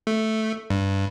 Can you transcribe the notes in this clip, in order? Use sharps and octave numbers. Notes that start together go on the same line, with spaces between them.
A3
G2